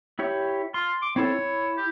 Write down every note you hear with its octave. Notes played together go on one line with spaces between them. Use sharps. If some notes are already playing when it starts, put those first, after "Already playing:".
E4 G4 C#5
F4 C6
D6
C4 E4 A4 C#5
E4
G4